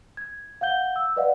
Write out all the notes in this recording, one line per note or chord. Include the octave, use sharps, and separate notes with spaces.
G#6
F5 F#5 G6 G7
E6
B4 D5 D#5 F5 F#5